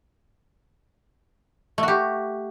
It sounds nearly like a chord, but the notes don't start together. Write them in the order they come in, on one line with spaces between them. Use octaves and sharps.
A3 F#4 G4